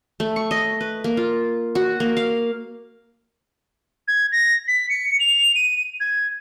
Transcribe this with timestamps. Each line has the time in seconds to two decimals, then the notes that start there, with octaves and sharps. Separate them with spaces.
0.20 A3
0.36 C#6
0.51 D#5
0.81 B4
1.04 A#3
1.17 F4
1.75 F#4
2.00 A#3
2.17 F5
4.08 G#6
4.32 A#6
4.68 B6
4.90 C#7
5.20 F7
5.55 D#7
6.00 G#6